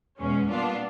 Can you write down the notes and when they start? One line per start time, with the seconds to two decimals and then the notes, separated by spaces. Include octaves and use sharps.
0.19 E2 B2 G#3 C#4
0.47 A#2 G3 B3 D4 F4